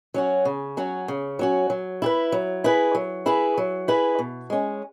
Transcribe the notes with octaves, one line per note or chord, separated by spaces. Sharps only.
F#3 C#4 F#4
C#3
F#3 C#4 F#4
C#3
F#3 C#4 F#4
F#3
E4 G#4 B4
F#3
E4 G#4 B4
F#3
E4 G#4 B4
F#3
E4 G#4 B4
B2
G#3 C#4